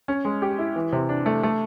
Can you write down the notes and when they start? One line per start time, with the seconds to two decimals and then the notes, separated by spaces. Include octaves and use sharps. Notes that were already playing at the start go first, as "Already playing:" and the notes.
0.08 C#4
0.25 G#3
0.42 G4
0.59 E4
0.76 E3
0.92 C3
1.09 D4
1.26 A3
1.43 A3